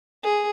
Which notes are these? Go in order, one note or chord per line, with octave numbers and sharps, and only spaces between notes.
G#4